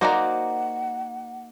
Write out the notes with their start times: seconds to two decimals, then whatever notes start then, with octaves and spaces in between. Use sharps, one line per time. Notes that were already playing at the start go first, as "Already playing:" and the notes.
0.01 A#3 D#4 F#4 C5 D5 F#5 A#5